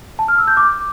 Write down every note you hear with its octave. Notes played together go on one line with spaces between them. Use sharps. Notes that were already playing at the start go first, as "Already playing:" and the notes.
A5
F6
E6
G6
D6